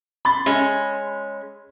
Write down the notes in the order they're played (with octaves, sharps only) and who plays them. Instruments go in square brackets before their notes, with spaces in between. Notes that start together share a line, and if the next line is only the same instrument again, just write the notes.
[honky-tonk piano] B5 C6 A6
[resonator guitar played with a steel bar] G#3 C#4